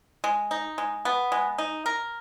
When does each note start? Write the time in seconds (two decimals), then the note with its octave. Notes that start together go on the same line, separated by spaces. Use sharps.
0.24 G#3
0.51 D#4
0.78 G#3
1.05 B3
1.32 G#3
1.58 D#4
1.86 A#4